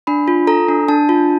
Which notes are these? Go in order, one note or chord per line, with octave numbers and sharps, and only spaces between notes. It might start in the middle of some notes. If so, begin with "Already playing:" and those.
D4 B5
F4
A4 A#5
D4
D4 A5
F4